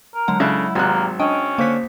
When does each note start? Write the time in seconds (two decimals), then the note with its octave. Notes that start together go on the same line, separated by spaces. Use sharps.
0.14 A#4
0.28 D3 F#3 G#3 F#5
0.40 C#3 D4 E4 A4 E5
0.75 G#1 C3 G3 A#3 F#6
1.19 C#4 D4 D#5 G5 D7
1.58 D3 A#3 C5 C#5 B6